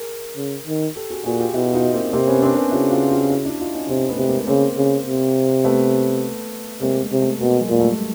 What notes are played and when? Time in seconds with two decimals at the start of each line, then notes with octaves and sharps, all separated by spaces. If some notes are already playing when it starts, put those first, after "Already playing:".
Already playing: G#4 A#4
0.37 C#3
0.67 D#3
0.96 G4 A4
1.10 F#4 G#4
1.25 A#2 F#4 G#4
1.39 F4 G4
1.54 B2 E4 F#4
1.74 D#4 F4
1.94 A#3 C4
2.13 C3 A#3 C4
2.27 B3 C#4
2.42 C4 D4
2.56 B3 C#4
2.71 C#3 E4 F#4
2.91 F4 G4
3.10 F4 G4
3.30 E4 F#4
3.45 D4 E4
3.60 D#4 F4
3.74 C#4 D#4
3.89 C3 C4 D4
4.09 A3 B3
4.18 C3
4.28 G#3 A#3
4.47 C#3 A#3 C4
4.77 C#3
5.06 C3
5.64 A3 B3
6.81 C3 G#3 A#3
7.01 G#3 A#3
7.12 C3
7.21 A3 B3
7.40 B2 G#3 A#3
7.60 F#3 G#3
7.70 A#2 G#3
7.80 G3 A3